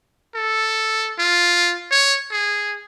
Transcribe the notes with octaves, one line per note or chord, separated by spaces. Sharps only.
A4
F4
C#5
G#4